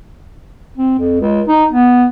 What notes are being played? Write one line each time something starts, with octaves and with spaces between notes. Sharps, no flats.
C4
F2
C#2
D#4
B3